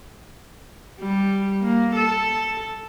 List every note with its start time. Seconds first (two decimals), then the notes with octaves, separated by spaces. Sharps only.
1.00 G3
1.61 A#3
1.96 A4